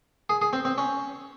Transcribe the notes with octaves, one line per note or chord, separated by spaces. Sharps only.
G#4
G#4
C4
C4
C#4